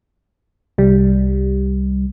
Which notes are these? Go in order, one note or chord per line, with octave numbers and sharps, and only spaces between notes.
C2 G3